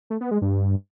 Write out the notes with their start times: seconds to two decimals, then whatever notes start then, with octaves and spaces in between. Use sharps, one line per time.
0.10 A3
0.21 B3
0.31 G#3
0.42 G2